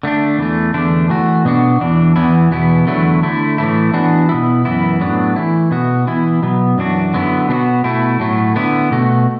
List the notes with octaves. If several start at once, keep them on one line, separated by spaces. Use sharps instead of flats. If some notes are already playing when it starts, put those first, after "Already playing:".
D3 A3 D4
E2 E3 A3
E2 D3 A3 D4
E3 A3 F#4
B2 B3 D4 F#4
E2 E3 D4
E2 E3 B3 E4
E2 B2 B3 E4
E2 D3 F#3 A3 E4
D3 A3 E4
A2 E3 A3 E4
E3 B3 D4 F#4
B2 B3 E4
F#2 E3 B3 E4
A2 F#3 B3 D4
E3 A3 E4
B2 B3 F#4
E3 B3 E4
B2 F#3 B3
F#2 E3 D4 F#4
D3 F#3 B3 E4
B2 B3 D4 F#4
B2 A3 E4
A2 F#3 A3
D3 B3 E4
B2 A3 F#4